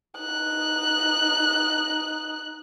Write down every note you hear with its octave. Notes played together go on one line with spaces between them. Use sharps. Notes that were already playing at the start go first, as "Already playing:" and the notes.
D#4 F#6